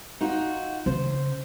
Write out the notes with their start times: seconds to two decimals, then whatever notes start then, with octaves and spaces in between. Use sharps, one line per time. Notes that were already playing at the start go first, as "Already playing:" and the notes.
0.21 D#4 F4 F#4
0.86 C#3 C5